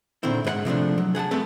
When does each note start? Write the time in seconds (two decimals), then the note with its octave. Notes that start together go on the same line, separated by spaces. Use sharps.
0.23 A#2 D3 D#3 C4 E4
0.44 G#2 B4 F#5
0.65 C3 F3 A3 D4
0.98 F#3
1.15 G#4 F#5 G#5 A5
1.31 A3 B3 C4 A4 B4 E5